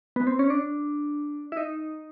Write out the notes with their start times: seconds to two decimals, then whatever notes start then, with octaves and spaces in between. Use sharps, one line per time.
0.16 B3
0.27 C4
0.39 C#4
0.50 D4
1.52 E4
1.57 D#4